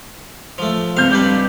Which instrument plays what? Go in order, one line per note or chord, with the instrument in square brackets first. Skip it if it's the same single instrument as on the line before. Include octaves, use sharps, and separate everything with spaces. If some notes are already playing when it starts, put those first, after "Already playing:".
[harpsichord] F3 A3
[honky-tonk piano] C#2 C4 G6 [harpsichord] F5
[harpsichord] G3 D4 B4